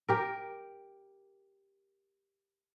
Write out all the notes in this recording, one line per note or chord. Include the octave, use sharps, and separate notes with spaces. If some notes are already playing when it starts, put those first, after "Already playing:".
G4 A#4